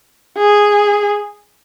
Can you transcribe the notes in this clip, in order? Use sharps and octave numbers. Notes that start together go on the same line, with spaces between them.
G#4